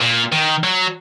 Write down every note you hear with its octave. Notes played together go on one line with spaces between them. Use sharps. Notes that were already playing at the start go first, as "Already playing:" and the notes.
A#2
D#3
F#3